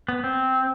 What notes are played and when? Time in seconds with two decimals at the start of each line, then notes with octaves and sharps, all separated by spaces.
0.08 B3
0.24 C4